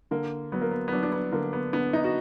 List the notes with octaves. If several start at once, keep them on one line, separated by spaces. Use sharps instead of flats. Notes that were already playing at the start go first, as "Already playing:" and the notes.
D3 A#3
F#3 B3
A#3
B3
B3
F#3 D4
D4
B3
D3 A#3
B3
D3 B3
D#4
F#4